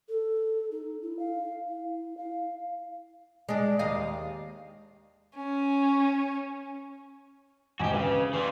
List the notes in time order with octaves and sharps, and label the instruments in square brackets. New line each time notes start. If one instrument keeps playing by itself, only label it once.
[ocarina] A4
D#4
E4
F5
E4
F5
[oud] G#3 D4
D#2 D#5 F5
[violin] C#4
[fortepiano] G#1 D2 G#2 [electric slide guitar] F#4 G4 [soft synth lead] G#5
[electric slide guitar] C#3 [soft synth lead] B4 [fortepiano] D#5
[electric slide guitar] E3 G3 [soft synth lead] C6